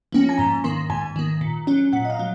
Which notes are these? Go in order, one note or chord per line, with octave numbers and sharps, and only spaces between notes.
F3 A#3 C#4
G#5
G#2 A#5
D#3 A#3 C6
G#2 G#5
D#3 A#3
A#2
F#3 C#4
A#2 F#5
D#5
F5
F#3